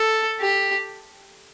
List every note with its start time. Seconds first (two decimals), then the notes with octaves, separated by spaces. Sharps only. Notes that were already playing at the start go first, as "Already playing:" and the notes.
Already playing: A4
0.40 G4